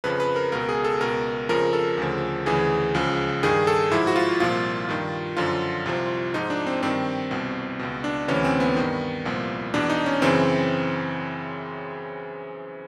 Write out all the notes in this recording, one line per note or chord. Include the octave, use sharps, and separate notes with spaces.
F2 C#3 F3 B4
B4
A#4
C#2 B2 A#4
G#4
A4
C#2 B2 A#4
F2 C#3 F3 A#4
A4
D2 C#3 F3
D2 C#3 E3 G#4
C#2 C#3 F3
G2 D#3 G#4
A4
G#2 F3 E4
F#4
F4
C2 A#2 F3 F4
G2 D#3
F#2 D3 F3 F4
C2 C3 F3
G#2 F3 D#4
D4
C4
G2 D#3 C4
C2 B2
C#2 B2
D4
D2 C3 E3 C#4
C4
B3
G2 D#3
C2 A#2 F3
E2 B2 D4
D#4
C#4
F#2 C#3 E3 C4